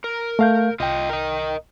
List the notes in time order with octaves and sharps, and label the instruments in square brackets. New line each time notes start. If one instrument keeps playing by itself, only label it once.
[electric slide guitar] A#4
[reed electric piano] A3 F5 G6
[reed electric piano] C2 G5 [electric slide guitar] F4 D#5
[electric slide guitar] A#4 D#5